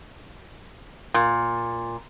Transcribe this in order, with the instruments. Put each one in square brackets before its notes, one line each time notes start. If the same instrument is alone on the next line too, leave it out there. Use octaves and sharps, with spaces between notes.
[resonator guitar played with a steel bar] A#2